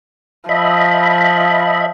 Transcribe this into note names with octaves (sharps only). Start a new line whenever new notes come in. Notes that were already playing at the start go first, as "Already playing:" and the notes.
F3 D#5 E5 B5